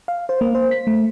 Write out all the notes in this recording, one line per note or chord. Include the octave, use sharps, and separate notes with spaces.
F5
C5
A#3
C5
B6
A3